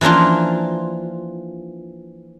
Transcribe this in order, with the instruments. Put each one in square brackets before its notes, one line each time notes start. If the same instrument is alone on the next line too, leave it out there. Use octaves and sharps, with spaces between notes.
[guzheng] E3 F3 A#3 D4 F4